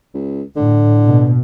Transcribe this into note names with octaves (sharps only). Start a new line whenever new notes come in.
C#2
A2 D3
B2